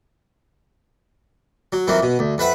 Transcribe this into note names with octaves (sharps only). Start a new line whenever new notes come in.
F#3
F2 E3 F#3 A#3
B2
D2
F2 B4 E5 F#5